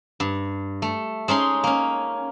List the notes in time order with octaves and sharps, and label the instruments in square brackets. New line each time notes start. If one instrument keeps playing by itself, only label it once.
[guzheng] G2
A3
G#3 C#4 D#4 C6
A#3 C#4